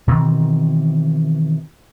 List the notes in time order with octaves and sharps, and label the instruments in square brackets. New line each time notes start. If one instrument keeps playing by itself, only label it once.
[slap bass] B2 D#3 E3 C4